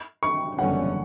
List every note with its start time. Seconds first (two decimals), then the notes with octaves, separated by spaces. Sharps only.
0.23 C#6
0.58 F#1 E2 D3 G3 C#4 F#5